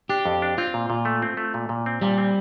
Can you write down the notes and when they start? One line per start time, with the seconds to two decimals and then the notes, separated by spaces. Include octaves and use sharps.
0.09 D4 G4
0.25 F2
0.42 D4
0.58 C4 F4
0.74 A#2
0.90 A#2
1.05 A3
1.22 C4
1.37 A3
1.54 A#2
1.69 A#2
1.86 C4
2.01 A#2 G3
2.18 C4